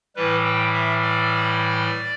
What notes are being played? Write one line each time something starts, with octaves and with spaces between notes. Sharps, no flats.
A2 E3 G3 B4
G5
E5
D5